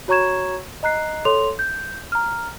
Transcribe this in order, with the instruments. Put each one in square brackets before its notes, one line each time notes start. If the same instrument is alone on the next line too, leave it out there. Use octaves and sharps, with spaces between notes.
[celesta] F#4 C#5 A#5 C#6 G#6 E7
D#5 A#5 F#6 C7
A4 C#5 C6 F7
G6
A#5 F6